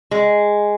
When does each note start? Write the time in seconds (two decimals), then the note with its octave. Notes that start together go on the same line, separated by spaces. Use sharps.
0.11 G#3